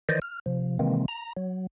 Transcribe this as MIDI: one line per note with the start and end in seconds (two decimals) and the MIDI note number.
0.09 0.20 51
0.09 0.20 52
0.09 0.20 72
0.09 0.20 74
0.09 0.20 75
0.22 0.39 89
0.46 0.78 48
0.46 0.78 53
0.79 1.06 48
0.79 1.06 51
0.79 1.06 52
0.79 1.06 56
0.79 1.06 58
0.79 1.06 60
1.08 1.33 82
1.37 1.67 54